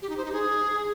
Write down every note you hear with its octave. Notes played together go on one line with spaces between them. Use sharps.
G4
D#4
C5
D#4
G#4